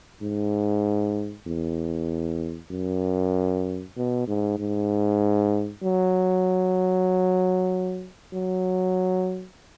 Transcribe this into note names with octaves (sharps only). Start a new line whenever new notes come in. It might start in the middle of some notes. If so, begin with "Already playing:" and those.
G#2
E2
F#2
B2
G#2
G#2
F#3
F#3